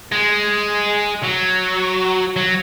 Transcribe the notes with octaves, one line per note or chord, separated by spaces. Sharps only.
G#3
F#3
F#3